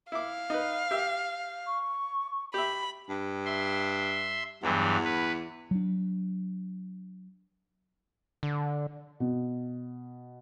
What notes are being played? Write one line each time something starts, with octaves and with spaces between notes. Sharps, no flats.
E4 F5 D6
D#4 B4
G4 E5
C#6
G4 E5 B5
G2
E5 C6
E2 G2 E3 F#3
B4
F#3 D4
D3
B2